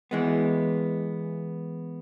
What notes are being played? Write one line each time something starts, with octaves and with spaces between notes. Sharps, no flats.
E3 G#3 B3